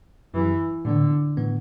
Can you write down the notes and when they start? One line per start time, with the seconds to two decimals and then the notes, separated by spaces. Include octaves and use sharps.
0.34 F#2 E3 F#3 C4 E4 G4
0.85 A2 D3 E3 B3
1.37 A2 E3 B3